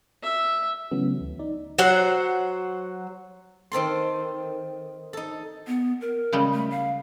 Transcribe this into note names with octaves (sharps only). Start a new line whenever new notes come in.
E5
C#3 E3 F#3 A3 B3 C#4
D2
D#4 D5
F#3 C5 F#5
D#3 C4 A4 C6
D#4 A4
B3
A#4
C#3 G3 G#3
A3
F5